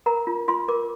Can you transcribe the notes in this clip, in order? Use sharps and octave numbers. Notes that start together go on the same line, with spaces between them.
A#4 A#5
F4
F4 C6
A#4 D6